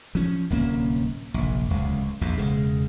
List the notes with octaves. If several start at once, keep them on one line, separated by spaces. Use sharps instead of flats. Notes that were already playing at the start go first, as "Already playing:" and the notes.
F3 C#4
D1 C2 A#3 C#4
F1 A#1
D1 C#2
A#1 E2 G#2
E1 C#3 G#3